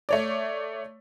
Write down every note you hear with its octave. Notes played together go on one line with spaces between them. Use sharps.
A3 C#5 D5